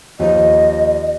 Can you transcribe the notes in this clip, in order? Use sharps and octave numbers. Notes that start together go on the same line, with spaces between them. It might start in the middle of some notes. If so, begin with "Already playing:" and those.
D#2 F3 D#5